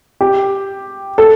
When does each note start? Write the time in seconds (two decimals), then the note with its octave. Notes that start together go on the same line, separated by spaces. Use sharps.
0.21 G4
1.18 A4